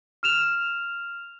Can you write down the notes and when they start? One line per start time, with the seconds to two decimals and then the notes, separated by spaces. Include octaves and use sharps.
0.23 F6 E7 F7